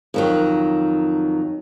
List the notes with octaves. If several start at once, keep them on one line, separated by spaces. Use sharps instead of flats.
F2 D#3 F#3